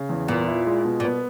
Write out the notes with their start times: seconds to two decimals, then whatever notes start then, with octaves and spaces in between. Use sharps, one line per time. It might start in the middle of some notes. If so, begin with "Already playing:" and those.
Already playing: C#3
0.09 E2
0.28 A#2 B3
0.48 E4
0.67 G#3
0.85 B2
1.00 A#2
1.05 B3